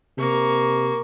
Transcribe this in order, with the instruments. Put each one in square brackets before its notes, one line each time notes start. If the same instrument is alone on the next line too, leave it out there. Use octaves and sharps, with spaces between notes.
[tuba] C3 [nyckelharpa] A#3 C#6